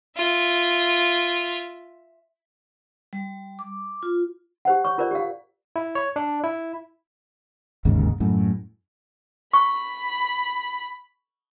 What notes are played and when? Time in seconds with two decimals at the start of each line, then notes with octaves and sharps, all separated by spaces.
0.18 F4 E5
3.13 G3
3.59 D6
4.03 F4
4.65 G4 C5 F#5
4.85 C#5 C#6
4.98 F4 A#4 C5 D5
5.11 G4 F5
5.76 E4
5.95 C#5
6.16 D4
6.44 E4
7.85 G1 D#2 G#2 C#3
8.20 F#2 A2
9.53 B5 C#6